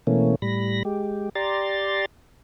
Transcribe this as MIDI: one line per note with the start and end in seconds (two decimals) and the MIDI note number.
0.07 0.35 47
0.07 0.35 52
0.07 0.35 57
0.07 0.35 58
0.07 0.35 61
0.42 0.83 45
0.42 0.83 55
0.42 0.83 83
0.42 0.83 94
0.85 1.29 56
0.85 1.29 67
1.35 2.05 67
1.35 2.05 74
1.35 2.05 82
1.35 2.05 84
1.35 2.05 93